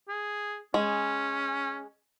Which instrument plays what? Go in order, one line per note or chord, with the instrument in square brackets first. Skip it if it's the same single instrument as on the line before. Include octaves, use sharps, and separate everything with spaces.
[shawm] G#4
[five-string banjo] G#3 [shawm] C#4